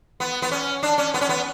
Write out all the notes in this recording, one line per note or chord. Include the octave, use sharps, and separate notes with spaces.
B3
B3
C#4
D4
C#4
B3
C#4
B3